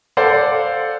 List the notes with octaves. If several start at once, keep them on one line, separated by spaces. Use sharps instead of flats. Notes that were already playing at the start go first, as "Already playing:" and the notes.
A4 C5 D5 F5 F#5